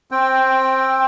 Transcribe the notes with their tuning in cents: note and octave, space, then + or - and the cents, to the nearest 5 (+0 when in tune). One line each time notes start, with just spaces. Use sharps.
C4 +15 G5 +0